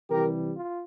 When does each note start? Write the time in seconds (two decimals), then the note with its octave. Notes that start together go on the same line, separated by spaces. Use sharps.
0.10 C3 E3 G3 G4 A#4
0.57 F4